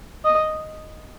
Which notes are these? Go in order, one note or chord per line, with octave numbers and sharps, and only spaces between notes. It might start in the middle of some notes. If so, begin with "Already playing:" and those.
D#5